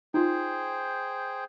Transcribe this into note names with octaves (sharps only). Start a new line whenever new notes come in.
D#4 F4 G#4 C5 G5